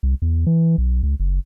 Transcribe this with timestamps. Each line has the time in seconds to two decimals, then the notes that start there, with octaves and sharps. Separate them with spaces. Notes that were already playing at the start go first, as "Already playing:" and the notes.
0.03 C2
0.22 E2
0.46 E3
0.78 B1
1.03 C#2
1.20 F#1